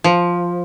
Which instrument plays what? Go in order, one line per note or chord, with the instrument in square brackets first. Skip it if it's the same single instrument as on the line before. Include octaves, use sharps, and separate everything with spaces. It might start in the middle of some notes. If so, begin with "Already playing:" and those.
[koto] F3